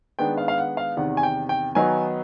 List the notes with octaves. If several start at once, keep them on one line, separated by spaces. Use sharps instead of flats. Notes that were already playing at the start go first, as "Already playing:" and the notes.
D#3 G#3 B3 D4 G5
F5
F5
F#5
F5
E2 C3 D#3 F#5
G#5
G5
G5
D#3 F#3 B3 D#4 G#5